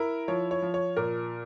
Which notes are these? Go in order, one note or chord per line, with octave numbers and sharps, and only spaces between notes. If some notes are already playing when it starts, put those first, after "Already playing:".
Already playing: E4 A#4
F3 C#5
C#5
F3
C#5
A#2 A#4